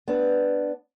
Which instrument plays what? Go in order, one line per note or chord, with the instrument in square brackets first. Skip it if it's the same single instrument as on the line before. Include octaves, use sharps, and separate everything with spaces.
[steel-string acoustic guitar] B3 D4